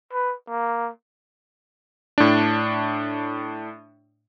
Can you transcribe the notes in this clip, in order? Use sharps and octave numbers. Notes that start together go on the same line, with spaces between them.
B4
A#3
A2 D4